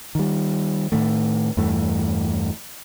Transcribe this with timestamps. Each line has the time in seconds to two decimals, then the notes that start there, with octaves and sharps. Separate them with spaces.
0.15 D#3 G3
0.92 A2 D#3 A3
1.57 E2 G2 E3 A3